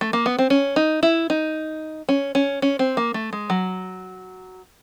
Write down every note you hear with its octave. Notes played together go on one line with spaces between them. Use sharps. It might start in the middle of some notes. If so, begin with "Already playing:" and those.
A3
A#3
B3
C4
C#4
D#4
E4
D#4
C#4
C#4
C#4
C4
A#3
A3
G#3
F#3